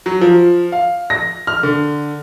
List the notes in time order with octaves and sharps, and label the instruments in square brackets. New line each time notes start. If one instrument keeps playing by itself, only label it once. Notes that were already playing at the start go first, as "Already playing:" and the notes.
[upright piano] F#3
F3
F5
A#6
F6
D3